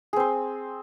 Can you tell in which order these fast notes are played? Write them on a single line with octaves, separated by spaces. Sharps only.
G#4 C4 C5